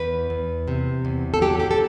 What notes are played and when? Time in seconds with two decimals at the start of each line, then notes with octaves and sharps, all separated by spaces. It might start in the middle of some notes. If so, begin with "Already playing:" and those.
Already playing: E2 B4
0.30 E2
0.68 C3
1.05 E2
1.34 A4
1.41 F#3 G4
1.60 G4
1.71 A4